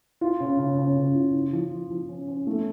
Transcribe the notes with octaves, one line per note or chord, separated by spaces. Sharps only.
F4
C#3
C#3
C#3
C#3
F4
F4
F3
F4
F3
C#4
C#4
A3